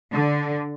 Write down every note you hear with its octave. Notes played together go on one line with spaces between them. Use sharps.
D3